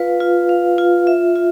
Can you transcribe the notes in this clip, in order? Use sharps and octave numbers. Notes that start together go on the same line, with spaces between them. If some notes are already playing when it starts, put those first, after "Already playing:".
Already playing: F4 B4 F5
F4
F5
F4
E5
F4